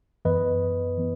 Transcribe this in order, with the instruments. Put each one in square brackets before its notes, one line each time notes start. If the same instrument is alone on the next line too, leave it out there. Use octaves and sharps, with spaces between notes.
[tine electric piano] F#2 E3 B3 B4 D#5
E3 B3